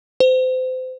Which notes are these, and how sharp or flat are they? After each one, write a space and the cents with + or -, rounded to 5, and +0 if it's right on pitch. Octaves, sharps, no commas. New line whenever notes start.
C5 -30